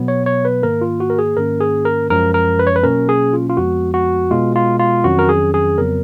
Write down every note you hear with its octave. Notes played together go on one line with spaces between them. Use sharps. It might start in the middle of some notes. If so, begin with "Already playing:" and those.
Already playing: B2 F#3 B3
C#5
C#5
B4
G#2 D#3 A#3 A#4
F4
F#4
A#4
G#4
G#2 D#3 A#3 C#4 A#4
G#4
A#4
F#2 F3 G#3 C#4 A#4
A#4
B4
C#5
B4
B2 F#3 A#3 C#4 A#4
G#4
F4
F4
F2 F3 G#3 B3 F#4
F#4
B2 G#3 B3 F4
F4
F4
F2 D#3 F#3 C#4 F#4
A#4
G#4
G#4
F2 C#3 F#3 B3 A#4